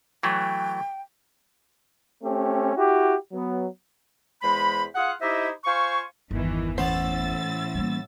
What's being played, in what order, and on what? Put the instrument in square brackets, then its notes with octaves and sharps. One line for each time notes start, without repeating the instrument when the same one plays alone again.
[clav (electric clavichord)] E3 F#3 A3 [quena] G5
[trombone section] A3 C4 C#4 G4
E4 F#4 G4
F#3 B3
[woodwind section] E2 G#3 C5 B5
F4 G#4 F5 F#5
D#4 E4 G4 C5 D#5 E5
F4 C5 F5 G#5 C#6
[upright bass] G1 E2 [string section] D#3 E3
[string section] A2 E6 A6 [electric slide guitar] E3 C#4 C5 [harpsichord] B3
[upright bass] G3 A#3